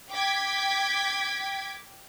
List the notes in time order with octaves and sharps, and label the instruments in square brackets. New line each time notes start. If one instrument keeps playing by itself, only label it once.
[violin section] G5 D6 G#6 B6